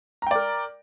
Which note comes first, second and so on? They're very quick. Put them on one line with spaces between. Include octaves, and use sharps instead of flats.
A#5 G5 D5 A#4